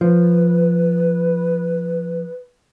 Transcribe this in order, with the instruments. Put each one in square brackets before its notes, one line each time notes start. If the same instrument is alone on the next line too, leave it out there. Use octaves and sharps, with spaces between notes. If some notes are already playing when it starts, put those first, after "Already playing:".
[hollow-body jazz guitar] F3 [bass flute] B4